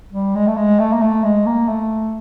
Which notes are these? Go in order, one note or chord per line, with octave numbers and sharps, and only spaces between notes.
G3
G#3
A3
G#3
A3
A#3
A3
G#3
A#3
A3